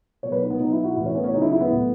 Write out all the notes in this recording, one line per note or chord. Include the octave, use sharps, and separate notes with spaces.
B2 F#3 C#5
B4
D#4
B3
B2 F#3 D#4
E4
F#4
A2 E3 E4
C#4
B3
C#4
C#3 F#3 D#4
E4
E4
B3
A2 F#3